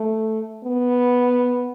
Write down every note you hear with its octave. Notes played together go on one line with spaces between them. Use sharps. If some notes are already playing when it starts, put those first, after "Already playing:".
Already playing: A3
B3